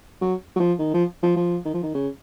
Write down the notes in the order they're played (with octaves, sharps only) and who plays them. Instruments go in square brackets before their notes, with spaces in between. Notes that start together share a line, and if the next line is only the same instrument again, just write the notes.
[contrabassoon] F#3
F#3
F3
D#3
F3
F3
F3
D#3
F3
D#3
C#3